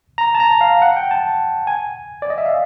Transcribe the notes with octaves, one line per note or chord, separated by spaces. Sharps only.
A#5
A5
A#5
F5
F#5
G5
A5
G#5
D5
D#5
E5
F5